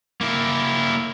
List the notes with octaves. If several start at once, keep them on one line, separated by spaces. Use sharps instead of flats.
A#3 E4